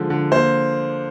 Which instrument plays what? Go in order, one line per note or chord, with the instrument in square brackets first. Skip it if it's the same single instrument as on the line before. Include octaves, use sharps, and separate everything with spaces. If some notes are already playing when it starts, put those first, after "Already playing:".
Already playing: [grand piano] D3 F3 G#3
D3
A#3 C5